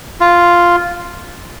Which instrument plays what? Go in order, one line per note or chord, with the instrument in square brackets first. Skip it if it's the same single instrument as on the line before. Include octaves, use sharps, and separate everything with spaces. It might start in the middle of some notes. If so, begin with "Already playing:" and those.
[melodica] F4